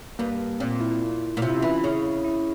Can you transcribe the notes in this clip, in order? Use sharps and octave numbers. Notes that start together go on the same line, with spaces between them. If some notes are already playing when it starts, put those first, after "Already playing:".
G2 A#3
A#2 C4
E4
A#2
C3 F4
E4
C#4
E3 E4
C#3
E4